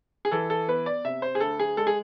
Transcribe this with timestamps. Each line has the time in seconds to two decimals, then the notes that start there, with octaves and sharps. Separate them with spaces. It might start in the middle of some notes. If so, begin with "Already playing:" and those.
0.25 G#4
0.31 E3 A4
0.50 A4
0.68 B3 B4
0.86 D5
1.05 C3 E5
1.22 C5
1.35 G#4
1.40 D2 A4
1.60 G#4
1.77 G#3 A4
1.87 G#4